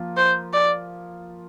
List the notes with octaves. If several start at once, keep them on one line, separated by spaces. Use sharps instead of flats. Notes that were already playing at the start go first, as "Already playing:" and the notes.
Already playing: F3 A#3 F4
C5
D5